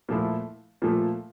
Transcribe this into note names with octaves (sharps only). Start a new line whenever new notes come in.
A#2 F3 A3 E4
A#2 F3 A3